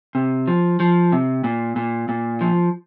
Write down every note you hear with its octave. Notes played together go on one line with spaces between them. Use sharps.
C3
F3
F3
C3
A#2
A#2
A#2
F3